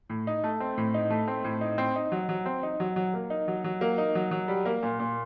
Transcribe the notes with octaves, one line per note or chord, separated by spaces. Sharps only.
A2
D#4
A3
C4
A2
D#4
A3
C4
A2
D#4
C4
D#4
F#3
F#3
C4
D#4
F#3
F#3
A#3
D#4
F#3
F#3
A#3
D#4
F#3
F#3
G3
A#3
A#2
A#2